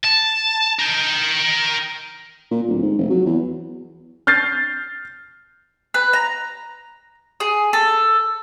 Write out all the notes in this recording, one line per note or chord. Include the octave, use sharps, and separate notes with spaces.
A5
A#4 G5
A#2
D1
G#2
F1
F#3
E2
F6 G6 A6 C7
B4
A#5
G#4
A4